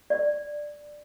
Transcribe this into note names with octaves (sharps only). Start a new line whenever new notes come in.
D5